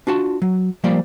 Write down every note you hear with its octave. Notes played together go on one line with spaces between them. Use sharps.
D4 F4 F#4 A5
F#3
F3 G3 A#3 C5 D5